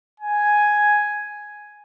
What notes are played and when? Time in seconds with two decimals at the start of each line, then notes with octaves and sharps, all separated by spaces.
0.20 G#5